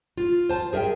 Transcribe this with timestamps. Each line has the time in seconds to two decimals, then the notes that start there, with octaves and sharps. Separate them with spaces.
0.17 F4
0.49 C5 A5
0.73 G#4 A#4 D#5 E5 G5